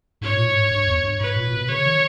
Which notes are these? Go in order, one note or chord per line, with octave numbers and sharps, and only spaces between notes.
G#2 C#5
A#2
G#2
G2
E2
G2
G#2 B4
A#2
A#2
B2
C#3 C#5
D#3